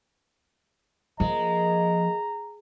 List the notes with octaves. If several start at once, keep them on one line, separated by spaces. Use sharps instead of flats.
F3 G#3 A#3 D#5 A#5